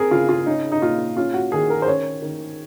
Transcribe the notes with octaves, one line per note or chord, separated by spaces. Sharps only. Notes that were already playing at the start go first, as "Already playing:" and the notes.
Already playing: C4 G#4 A#4
C#3 F4
F4
C#4 D#4
D#4
A#2 F4
C#4 F4
F#4
D#3 G#4
A#4
C5
C#4 C#5
D#3